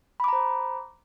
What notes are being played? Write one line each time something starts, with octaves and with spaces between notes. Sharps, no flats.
C5 A#5 B5 D6